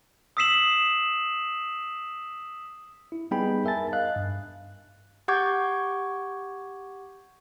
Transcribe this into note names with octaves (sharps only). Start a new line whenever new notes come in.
D#6 E6 B6 C7 E7 F#7
E4
G3 B3 D#4 G#4 G5 B5
A#4 E5 G#5 A5 A6
D#5 F5 F#6
G2
G4 F#5 C#6 D6 G6 G#6